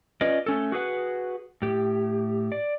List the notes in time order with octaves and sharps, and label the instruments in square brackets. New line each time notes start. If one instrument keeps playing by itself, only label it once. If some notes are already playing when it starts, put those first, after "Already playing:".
[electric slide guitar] C#4 F4 B4 D5 D#5
A3 C#4 A4
F#4 G#4 B4 F#5
A2 G4
D5